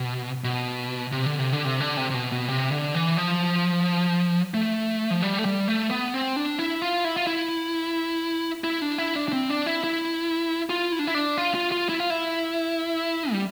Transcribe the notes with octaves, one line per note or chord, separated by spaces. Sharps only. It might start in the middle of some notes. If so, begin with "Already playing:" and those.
Already playing: B2
B2
C3
D3
C3
D3
C3
D3
C3
C3
B2
B2
C3
D3
E3
F3
A3
F3
G3
A3
G3
A3
B3
C4
D4
E4
F4
E4
F4
E4
E4
D4
E4
D4
D4
C4
D4
E4
E4
F4
E4
D4
E4
D4
F4
F4
F4
E4
F4
E4
G3